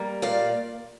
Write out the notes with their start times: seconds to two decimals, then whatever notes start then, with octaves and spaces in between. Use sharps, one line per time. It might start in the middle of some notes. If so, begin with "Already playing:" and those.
Already playing: G3 A#3
0.22 A#2 D5 F5